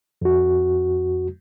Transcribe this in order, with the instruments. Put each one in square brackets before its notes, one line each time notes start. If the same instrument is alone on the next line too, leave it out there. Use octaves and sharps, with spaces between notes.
[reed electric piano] F2 F#4